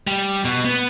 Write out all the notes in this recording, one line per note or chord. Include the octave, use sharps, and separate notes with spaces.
G3
B2
B3